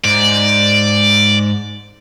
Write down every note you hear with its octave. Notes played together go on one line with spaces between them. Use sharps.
G#2 D5